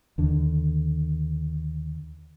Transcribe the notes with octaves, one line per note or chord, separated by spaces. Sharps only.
D#2 D3